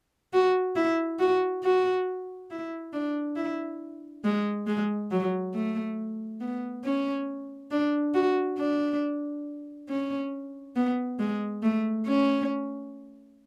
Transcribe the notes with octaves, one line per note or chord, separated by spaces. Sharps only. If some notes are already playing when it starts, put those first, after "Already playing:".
F#4
E4
F#4
F#4
E4
D4
E4
G#3
G#3
F#3
A3
B3
C#4
D4
F#4
D4
C#4
B3
G#3
A3
C#4